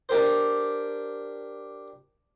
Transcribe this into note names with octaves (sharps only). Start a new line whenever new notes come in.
D4 G4 A#4 C5